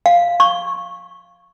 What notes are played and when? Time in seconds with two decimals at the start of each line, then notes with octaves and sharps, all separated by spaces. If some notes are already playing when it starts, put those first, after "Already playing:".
0.06 F5
0.40 C#6